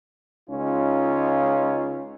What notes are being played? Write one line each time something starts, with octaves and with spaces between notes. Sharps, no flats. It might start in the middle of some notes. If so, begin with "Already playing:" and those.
C#2 C#4 D#4 F4